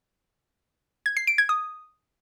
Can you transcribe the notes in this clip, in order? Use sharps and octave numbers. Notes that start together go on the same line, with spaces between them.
G#6
C7
D7
G#6
D#6